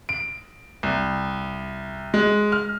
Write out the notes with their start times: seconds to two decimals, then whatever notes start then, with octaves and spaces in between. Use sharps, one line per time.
0.09 D7
0.83 C2
2.14 G#3
2.52 F6